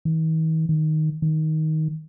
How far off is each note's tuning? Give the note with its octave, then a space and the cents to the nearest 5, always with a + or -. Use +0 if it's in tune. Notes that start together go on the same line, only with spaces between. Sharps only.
D#3 +45
D#3 +0
D#3 +10